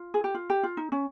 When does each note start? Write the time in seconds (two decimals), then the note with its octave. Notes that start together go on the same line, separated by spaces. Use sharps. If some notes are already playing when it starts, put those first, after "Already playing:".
Already playing: F4
0.14 G#4
0.24 G4
0.34 F4
0.50 G4
0.63 F4
0.77 D#4
0.92 C#4